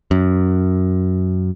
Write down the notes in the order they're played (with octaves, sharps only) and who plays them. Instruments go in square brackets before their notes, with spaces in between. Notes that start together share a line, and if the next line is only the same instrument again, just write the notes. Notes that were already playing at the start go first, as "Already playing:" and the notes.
[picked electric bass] F#2